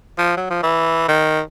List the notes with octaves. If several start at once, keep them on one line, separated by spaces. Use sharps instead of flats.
F3
F#3
F3
E3
D#3